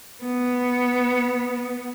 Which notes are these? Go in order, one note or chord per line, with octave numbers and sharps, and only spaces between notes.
B3